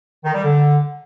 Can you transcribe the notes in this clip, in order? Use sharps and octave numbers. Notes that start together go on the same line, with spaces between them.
D#3
G3
D3